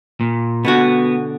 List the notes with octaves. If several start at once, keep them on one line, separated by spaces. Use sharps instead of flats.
A#2
B2 D3 B3 F#4